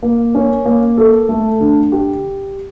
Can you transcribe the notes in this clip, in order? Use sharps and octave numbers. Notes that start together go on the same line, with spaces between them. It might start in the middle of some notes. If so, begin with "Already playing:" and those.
A#3
C#4
A#3
A4
A3
D3
G4